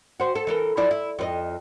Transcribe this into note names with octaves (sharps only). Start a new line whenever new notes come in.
F#4 C5
A4
E3 A4 A#4
F3 E4 D5
E4
F2 B4 D#5